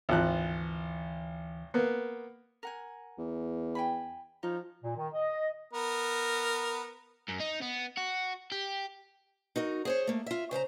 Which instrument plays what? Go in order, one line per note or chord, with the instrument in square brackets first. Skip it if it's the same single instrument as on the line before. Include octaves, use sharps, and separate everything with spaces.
[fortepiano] G#1 F3 F#6 [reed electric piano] D2 E3
[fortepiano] A#3 B3
[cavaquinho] A#4 F#5 G#5
[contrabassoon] E2
[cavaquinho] G5 G#5 B5
[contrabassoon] F3 [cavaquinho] D#4 C#5
[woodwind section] A#2
D#3
D#5
[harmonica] B3 A#4
[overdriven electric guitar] F#2
D#4
B3
F#4
G4
[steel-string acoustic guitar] D#4 F#4 A#4
G#4 C5 C#5
A3 A#3
F4 E5
C#3 C5 F5 A#5